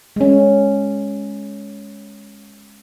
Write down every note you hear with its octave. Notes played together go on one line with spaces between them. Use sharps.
G#3 C#4